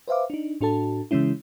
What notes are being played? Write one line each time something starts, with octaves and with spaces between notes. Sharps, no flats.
B4 C5 E5 F5 D6
D4 D#4
A2 D4 F#4 A4 A5
C#3 E3 G#3 C#4 E4